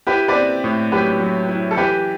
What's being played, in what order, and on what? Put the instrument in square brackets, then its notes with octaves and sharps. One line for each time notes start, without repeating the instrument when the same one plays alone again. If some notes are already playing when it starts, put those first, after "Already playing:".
[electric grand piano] E4 [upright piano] G4 B4
[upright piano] B4 D5
[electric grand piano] C4
A2
[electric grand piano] F#3 [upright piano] G4 B4
[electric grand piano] F#3
E4
[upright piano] A4
[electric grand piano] E3 [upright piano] G4 B4